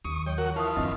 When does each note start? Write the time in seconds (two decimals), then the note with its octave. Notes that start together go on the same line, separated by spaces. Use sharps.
0.05 D#2 C#6 D#6
0.26 F#3 C#5 G5
0.38 F#3 F#4 A#4
0.56 E3 F4 A5 C#6 D#6
0.76 F#2 D3 C4 D4 D#5